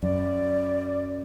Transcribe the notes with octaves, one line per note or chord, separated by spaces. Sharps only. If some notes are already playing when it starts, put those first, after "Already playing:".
F#2 D5